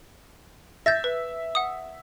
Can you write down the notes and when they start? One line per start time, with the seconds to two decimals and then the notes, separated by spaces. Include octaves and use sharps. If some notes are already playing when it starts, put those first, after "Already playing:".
0.86 E5 G6 A6 A#6
1.04 B4
1.55 F#5 D#6